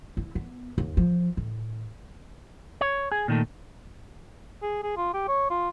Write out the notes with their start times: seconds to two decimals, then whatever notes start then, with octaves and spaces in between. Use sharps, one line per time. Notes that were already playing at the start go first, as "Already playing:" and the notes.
0.17 E4
0.35 B3
0.78 D#2
0.97 F3
1.37 A2
2.81 C#5
3.12 G#4
3.28 A#2 D#3 A3
4.63 G#4
4.83 G#4
4.97 F4
5.14 G4
5.28 C#5
5.50 F4